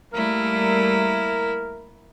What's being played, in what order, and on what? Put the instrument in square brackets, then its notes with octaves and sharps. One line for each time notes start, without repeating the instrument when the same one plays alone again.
[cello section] G3 A3 [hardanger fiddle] A#3 E4 [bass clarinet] A#4